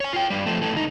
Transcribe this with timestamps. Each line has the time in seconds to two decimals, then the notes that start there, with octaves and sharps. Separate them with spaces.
0.01 C#5 G#5
0.13 F4 G5
0.30 G2 G3
0.46 F3 A3
0.61 E3 A3
0.73 C#2 D#4